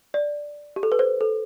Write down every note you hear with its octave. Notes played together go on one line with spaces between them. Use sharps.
D5
G4
A4
B4
C5
A4